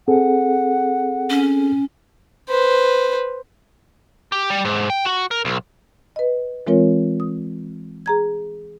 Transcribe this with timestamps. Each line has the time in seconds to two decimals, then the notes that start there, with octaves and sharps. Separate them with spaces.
0.08 C4 G#4 A4 F#5
1.30 C#4
2.49 B4 C5
4.32 G4
4.50 G3
4.65 G#2
4.90 G5
5.05 F#4
5.31 A#4
5.45 B1
6.16 B4 D#5
6.67 E3 G#3 C4 F4 A#4 C#5
7.20 D#6
8.06 G#4 A#5 G#6